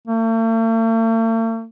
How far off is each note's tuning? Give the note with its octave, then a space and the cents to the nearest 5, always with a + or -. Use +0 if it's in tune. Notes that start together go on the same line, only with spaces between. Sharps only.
A3 +45